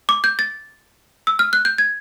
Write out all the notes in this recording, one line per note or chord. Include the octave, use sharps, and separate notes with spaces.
D6
G6
A6
E6
F6
F#6
G6
G#6